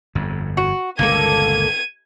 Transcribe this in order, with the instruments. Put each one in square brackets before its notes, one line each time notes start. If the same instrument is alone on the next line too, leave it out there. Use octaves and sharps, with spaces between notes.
[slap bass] G1 F2
[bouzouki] F#4
[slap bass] G1 C#2 A#2 [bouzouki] A#3 A4 [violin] G#6 D#7